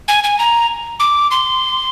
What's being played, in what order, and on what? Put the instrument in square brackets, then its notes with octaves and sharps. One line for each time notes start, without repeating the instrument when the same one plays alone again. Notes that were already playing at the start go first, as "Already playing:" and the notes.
[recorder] G#5
G#5
A#5
D6
C6